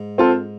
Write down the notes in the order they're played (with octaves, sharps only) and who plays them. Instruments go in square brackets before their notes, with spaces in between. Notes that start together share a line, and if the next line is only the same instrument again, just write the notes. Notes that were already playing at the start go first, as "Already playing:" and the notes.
Already playing: [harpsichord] G#2
[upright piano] C4 F4 A4